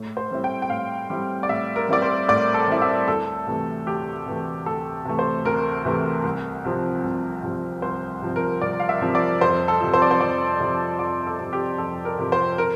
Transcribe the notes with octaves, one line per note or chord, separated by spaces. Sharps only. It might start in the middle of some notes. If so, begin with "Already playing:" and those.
Already playing: A2
C5
G3 C4 E4
G5
G5
A2 F5
G3 C4 E4
D5
A2 E5
A#4
G3 C4 E4 D5
C5
A2 D5
A4
G3 C4 E4
E5
D2 A4
C3 E3 A3
D2 G4
C3 E3 A3
D2 A4
C3 E3 A3
C5
D2 A#4
C3 E3 A3
C2
C3 F3 C4
C2
C3 F3 C4
C2 C5
C3 F3 C4
A#4
C2 D5
F5
E5
C3 F3 C4
D5
F2 C5
A4
C3 F3
C5
D5
C5
F2 D5
C3 F3
F2 D5
A4
C3 F3
G4
F2 A4
A#4
C3 F3
C5
A#4